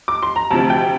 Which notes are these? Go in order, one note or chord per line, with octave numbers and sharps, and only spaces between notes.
D6
C6
A#5
D2 C3 F3 A5
G5